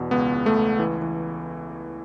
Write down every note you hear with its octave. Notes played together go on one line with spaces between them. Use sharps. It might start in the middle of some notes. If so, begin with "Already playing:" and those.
Already playing: E2 B2
C#2 B3
C#2
A3
C#2
E3
E3